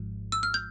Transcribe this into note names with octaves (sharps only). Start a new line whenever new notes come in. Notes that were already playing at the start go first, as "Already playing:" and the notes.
Already playing: G#1 G#2 F3 G#3
E6
F6
G6